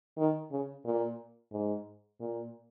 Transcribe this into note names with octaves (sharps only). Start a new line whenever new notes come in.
D#3
C#3
A#2
G#2
A#2